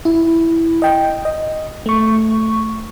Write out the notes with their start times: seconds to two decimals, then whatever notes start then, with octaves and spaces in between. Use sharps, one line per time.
0.05 E4
0.82 D#5 G5
1.25 D#5
1.86 A3 C#6